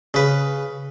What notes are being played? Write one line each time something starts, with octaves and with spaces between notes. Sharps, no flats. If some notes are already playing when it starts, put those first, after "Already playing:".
C#3 B4